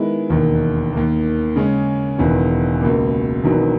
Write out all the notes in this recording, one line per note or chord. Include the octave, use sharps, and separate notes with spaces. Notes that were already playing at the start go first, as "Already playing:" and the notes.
Already playing: D#3 G#3 B3 E4
E1 D#2 D#3
D#2 D#3 A#3
C#3 G#3 C#4
E1 E2 D#3
C#2 B2 A#3
E1 E2 D#3 F#3